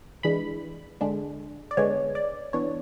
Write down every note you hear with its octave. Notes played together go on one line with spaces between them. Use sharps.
E3 G#3 D4 B5
D3 G#3 D4
D5
D3 G#3 B3 D4 C#5
D5
E3 B3 D4 C#5